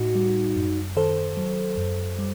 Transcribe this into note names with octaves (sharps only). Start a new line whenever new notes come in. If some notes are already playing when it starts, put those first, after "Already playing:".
Already playing: A2 D#4 F#4
G3
F#2
D#3 A4 C5
F#3
F#2
G3